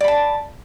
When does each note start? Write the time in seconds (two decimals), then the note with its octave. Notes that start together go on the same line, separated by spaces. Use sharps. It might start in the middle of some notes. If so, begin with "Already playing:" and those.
0.01 D5
0.04 B5
0.08 A5